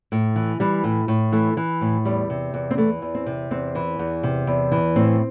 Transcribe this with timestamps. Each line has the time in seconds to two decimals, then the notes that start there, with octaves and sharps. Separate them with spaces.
0.12 A2
0.36 E3
0.60 E3 G3
0.84 A2
1.08 A2
1.32 E3 A3
1.57 E3
1.81 A2
2.05 E2 G3
2.30 C3
2.54 E2
2.71 C4
2.77 E3 A3
3.02 E2
3.15 C4
3.26 C3
3.51 E2 C4
3.75 E3
3.99 E2
4.23 C3
4.47 E2
4.72 E3
4.96 A2 C4